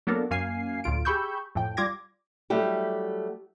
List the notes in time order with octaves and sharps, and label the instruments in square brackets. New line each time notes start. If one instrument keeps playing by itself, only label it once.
[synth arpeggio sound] F#3 A#3 B3 D4 A4 A#4
F#2 A#3 F5 G#5 C7
D2 A2 F4 D7
G4 G#4 B5 C#6 E6 G6
F2 A2 G5
G3 F4 D6 G#6 A#6
[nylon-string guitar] F#3 G3 A3 E4 G4